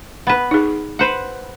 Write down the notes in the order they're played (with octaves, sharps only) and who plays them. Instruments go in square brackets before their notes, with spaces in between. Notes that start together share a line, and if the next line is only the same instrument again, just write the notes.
[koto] B3 B4
[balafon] D#4 G#4
[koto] B4 C5 F#5